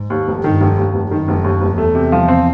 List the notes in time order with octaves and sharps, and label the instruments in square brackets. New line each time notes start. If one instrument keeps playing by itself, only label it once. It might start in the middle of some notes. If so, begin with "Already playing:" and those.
Already playing: [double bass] G#2
[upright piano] D#2
F1
[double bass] G2 [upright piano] D#3
[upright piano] F1
D#2
F1
[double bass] F#2 [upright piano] D#3
[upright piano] F1
D#2
F1
[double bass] E2 [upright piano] A3
[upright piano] C3
F3
C4